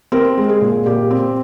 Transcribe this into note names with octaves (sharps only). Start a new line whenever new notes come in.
C4 A#4
G#3
G#4
A#2
A#2 G4
C4